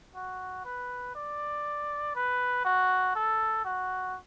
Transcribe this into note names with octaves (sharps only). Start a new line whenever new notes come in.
F#4
B4
D5
B4
F#4
A4
F#4